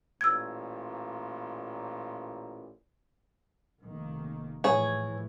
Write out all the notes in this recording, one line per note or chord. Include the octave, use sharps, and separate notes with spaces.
A1 A#2 E6 G#6
F1 D#3 A#3
A2 E3 F3 G#4 C#5